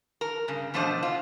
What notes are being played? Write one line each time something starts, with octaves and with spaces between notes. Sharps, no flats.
A#4
G2 C#3
B2 F3 A3 D4 C5 D#5
F4